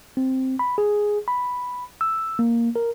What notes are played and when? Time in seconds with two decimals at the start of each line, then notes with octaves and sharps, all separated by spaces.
0.17 C4
0.59 B5
0.78 G#4
1.28 B5
2.01 E6
2.39 A#3
2.76 A#4